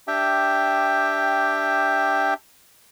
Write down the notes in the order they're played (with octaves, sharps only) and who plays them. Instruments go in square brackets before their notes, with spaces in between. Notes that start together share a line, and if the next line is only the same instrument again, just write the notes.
[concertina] D4 G4 E5 G5